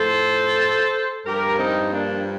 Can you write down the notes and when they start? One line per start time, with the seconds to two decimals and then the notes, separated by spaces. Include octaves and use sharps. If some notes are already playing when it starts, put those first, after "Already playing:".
Already playing: A2 F3 A4 C5
1.26 G2 F3 G4 A#4
1.59 C4 D#4
1.92 A#3 D4